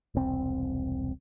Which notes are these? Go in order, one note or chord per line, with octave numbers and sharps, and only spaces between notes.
E1 C2 C4